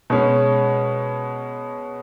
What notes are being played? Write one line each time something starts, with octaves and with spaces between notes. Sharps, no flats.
B2 G#3 C#4